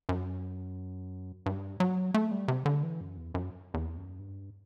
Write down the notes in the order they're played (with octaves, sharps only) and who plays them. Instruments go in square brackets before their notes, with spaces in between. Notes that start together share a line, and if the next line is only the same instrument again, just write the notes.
[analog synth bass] F#2
G2
F#3
A3
G3
C3
D3
E3
F#2
E2
F#2
E2
F#2
G2